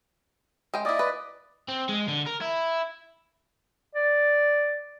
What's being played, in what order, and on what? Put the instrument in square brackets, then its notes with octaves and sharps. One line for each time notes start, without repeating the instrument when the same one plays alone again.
[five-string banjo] G#3 G5
[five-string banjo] A#3 E4 [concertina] D5 D#5
[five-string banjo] B4
[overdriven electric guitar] C4
G#3
D3
A#4
E4
[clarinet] D5